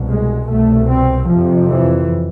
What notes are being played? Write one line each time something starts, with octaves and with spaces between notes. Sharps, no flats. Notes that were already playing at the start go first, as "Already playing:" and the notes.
Already playing: C2 B2
G#3
C2 B2 A3
C4
F2 C3 F3
E3